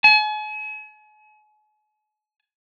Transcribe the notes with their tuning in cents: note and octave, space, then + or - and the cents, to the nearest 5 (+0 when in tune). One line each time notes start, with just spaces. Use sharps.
G#5 +45